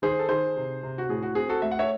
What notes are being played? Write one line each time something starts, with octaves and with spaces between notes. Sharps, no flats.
D#3 G#4 C5
A4
D#3 G#4 C5
C3
C3
F#4
A2 G#4
F#4
C4 G#4
F#4 A4
A3 E5
F#5
C#5 E5